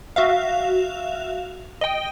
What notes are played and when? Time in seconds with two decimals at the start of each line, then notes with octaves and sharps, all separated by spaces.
0.16 F#4 E5 F5
1.81 D#5 G5